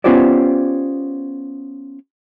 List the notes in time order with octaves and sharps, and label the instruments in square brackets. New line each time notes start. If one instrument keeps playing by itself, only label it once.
[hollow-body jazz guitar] B3 C#4 F4 G4 C5 D5